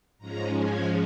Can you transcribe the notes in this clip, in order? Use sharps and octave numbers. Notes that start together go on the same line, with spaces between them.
G#2 F3 G#3 C#4 A#5
G#5